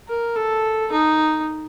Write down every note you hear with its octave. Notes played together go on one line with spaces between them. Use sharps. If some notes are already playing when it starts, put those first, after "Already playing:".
A#4
A4
D#4